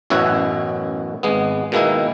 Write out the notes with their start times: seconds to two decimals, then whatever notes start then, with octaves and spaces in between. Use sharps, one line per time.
0.10 A1 F#2 B2 E4 C#5 F#5
1.23 G#1 G#3 B3
1.72 B2 D#3 G#3 A#3 E4